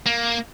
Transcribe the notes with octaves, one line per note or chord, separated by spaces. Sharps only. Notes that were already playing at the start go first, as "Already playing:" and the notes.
A#3